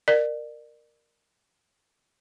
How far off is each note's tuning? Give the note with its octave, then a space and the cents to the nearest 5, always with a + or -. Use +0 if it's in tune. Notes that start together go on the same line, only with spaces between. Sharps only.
A#4 +0 D5 +35